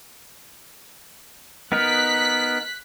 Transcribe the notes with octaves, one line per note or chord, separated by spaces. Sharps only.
B3 D#4 A#4 F#6 B6